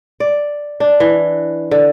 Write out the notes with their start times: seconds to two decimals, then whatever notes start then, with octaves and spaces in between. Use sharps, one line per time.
0.20 D5
0.80 D4
1.00 E3
1.71 D3